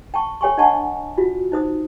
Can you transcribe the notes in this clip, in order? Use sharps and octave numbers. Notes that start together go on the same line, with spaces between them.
G5 A5 C#6
A4 C#5 G5 G#5 C6 C#6
D4 D#5 F#5 G#5 A5 C#6
F4 F#4
D#4 C5 D#6